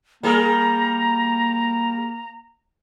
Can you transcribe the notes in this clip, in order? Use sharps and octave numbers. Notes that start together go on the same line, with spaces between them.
G3 A#3 G#4 A#4 A#5